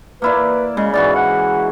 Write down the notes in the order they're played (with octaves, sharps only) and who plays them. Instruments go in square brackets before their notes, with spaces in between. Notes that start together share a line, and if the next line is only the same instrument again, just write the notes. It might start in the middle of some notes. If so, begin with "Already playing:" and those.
[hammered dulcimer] A#3 E4 D5 [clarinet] B4
[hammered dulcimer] C#3 [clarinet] G#3
[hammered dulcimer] G#2 E3 F#4 [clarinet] D5
[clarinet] F#5